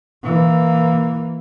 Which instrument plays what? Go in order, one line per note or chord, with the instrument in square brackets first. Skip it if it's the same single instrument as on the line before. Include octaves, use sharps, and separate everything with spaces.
[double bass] E3 A#3